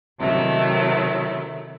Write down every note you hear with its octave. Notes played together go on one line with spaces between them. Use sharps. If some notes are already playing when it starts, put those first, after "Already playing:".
C3 D#3 F#3 A3 E4